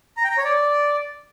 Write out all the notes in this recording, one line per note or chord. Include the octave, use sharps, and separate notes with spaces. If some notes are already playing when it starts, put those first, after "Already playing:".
A#5
G5
A#5
C#5
D5